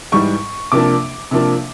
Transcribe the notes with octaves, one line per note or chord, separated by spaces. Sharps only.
G#2 E3 G3 C#6
C3 F3 A#3 D4 D6
C3 F3 A#3 D4